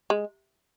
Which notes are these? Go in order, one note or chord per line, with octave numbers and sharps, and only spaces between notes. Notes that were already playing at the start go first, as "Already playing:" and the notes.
G#3